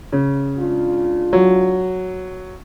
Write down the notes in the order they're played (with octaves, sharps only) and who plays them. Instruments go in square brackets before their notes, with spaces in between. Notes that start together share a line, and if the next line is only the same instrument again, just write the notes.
[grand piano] C#3
[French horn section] G#3 D4 F4
[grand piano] F#3